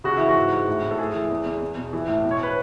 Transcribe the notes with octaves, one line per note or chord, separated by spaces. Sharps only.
C#3 F#4
E3 E4
F#4
G#2
G#2
A2
A2
A4
A2 G#4
E3
E2
E2
E2
B2
E3
A2
B2
C#5
B4